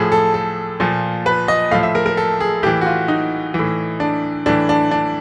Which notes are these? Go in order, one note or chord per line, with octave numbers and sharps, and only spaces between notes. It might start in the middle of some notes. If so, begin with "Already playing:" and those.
Already playing: A2 F3 G#4
A4
A4
A#2 F3
B4
D#5
A2 F3 F5
E5
A#4
A#4
A4
G#4
A2 E3 G4
F#4
F4
D#4
A2 E3
D4
A2 E3 D4
D4
D4